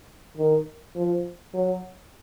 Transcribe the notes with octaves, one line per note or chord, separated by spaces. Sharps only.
D#3
F3
F#3